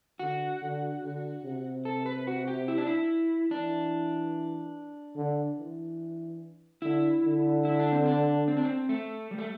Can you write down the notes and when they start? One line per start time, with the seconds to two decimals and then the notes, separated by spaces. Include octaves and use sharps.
0.19 D3 F#4
0.62 D3
1.02 D3
1.44 C3
1.85 A4
2.06 B4
2.27 F#4
2.48 G4
2.68 E4
2.77 D4
2.87 E4
3.51 E3 D4
5.16 D3
5.58 E3
6.82 D3 E4
7.24 D3
7.65 E4
7.79 D4
7.92 C4
8.06 D4
8.48 C4
8.57 D4
8.65 C4
8.89 A3
9.31 G3
9.38 A3